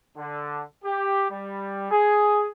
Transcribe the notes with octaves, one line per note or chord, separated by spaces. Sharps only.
D3
G4
G3
G#4